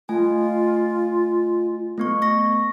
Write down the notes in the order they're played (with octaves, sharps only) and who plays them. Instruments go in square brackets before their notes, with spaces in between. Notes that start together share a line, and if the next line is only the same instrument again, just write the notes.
[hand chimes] A3 G#5 [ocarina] F4
[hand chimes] A3 B3 C#6
C#6 A#6